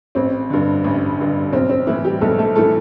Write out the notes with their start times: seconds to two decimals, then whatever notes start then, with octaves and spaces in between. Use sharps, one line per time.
0.15 A1 C4
0.50 G2 D3
0.84 A1
1.19 G2 D3
1.53 B1 C4
1.69 C4
1.87 A2 E3 E4
2.04 G3 G4
2.21 B1 A3 A4
2.38 A3 A4
2.55 A2 E3 A3 A4